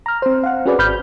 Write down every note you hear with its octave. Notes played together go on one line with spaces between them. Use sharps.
A#5 F6
C4 C5
F5 F#5
C#4 F#4 G#4 B4 D5
G#1 B5 F6 G6